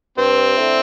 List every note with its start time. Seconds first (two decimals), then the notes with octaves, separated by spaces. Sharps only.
0.17 G2 C4
0.57 D3 A3 E4